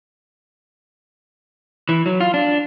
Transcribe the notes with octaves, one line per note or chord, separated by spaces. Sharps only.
E3
F#3
F4
D4